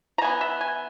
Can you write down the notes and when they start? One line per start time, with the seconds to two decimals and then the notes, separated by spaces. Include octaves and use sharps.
0.18 A#5
0.22 E3 B3 G#5
0.41 E5
0.61 G#5